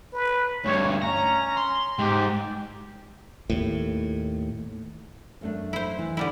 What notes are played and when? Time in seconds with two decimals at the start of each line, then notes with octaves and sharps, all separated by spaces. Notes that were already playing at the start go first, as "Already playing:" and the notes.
0.13 B4
0.65 D2 G2 C#5
1.02 C#4 A#5
1.57 C6
1.99 G#2 G4
3.50 D#2 A2
5.41 F#2 A3 D4
5.73 E4 C5
5.99 E3
6.17 D3 G3 E4